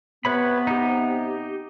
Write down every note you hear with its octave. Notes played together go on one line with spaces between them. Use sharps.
C3 B3 B4 C#5 B5
D#4 G4